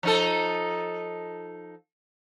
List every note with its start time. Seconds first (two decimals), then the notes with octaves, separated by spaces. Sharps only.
0.03 F3 D#4 A4